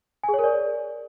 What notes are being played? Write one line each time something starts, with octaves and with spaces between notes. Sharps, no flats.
G#5
G#4
C#5
A#4
D5